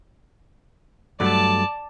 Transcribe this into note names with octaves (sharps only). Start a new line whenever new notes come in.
G2 F#3 A3 D5 A5